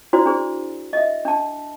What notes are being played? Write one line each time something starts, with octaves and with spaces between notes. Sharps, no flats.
D4 E4 F#4 C5 D5
D4 G#4 C5
D#5 E5
D4 A5